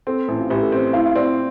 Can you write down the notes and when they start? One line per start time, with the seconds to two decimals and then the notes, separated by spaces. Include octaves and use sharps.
0.07 C4 A4
0.28 A1
0.40 F4
0.50 A1 G4
0.62 A4
0.72 C4 C5
0.93 A2 F5
1.06 F5
1.15 C4 D5